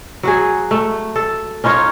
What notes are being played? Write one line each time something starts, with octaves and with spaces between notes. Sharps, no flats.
F#3 F#4 G#4
A3
A4
C#4 D#4 F4 C#5